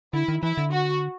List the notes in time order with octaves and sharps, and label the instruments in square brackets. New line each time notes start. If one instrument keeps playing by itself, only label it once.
[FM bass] D3 [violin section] E4
[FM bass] D#3
[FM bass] E3 [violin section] E4
[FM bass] D3
[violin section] F#4